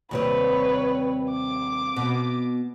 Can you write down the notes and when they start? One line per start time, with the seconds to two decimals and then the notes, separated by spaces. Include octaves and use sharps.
0.11 D#2 C3 G3 B4 C#5
1.31 D6
1.96 B2